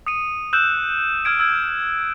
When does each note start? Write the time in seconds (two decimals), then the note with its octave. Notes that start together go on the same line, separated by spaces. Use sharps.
0.07 D#6 C#7 D#7
0.53 E6 F#6 G6 E7
1.25 E6 F6 G#6 D7
1.40 E6 F6 G#6